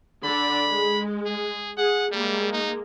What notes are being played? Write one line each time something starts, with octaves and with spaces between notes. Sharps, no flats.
D3 D4 D5 B5
G#3
G#4
G#4 F#5
G3 G#3 A#3
D#4